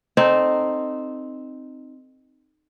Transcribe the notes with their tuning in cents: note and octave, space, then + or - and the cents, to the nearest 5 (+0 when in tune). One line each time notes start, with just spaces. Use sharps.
C4 +0 D#4 -15 A4 +5